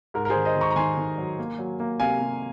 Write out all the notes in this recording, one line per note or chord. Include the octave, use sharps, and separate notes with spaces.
G#2 A#4
A#4
G#4 C5
D#3
C5 D#5
D#3 A#5 C#6
A#5
D#3 G#5 C6
D#3
F#3
A#3
F#3
A#3
C3 F5 G#5
C3